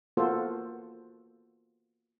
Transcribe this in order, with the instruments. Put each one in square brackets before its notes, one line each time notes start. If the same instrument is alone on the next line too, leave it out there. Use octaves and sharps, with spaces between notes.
[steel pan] A#3 B3 F4 F#4 A4 C5